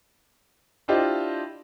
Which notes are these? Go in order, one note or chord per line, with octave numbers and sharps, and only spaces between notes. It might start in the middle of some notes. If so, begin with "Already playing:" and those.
D4 E4 F4 G4 C5 D#5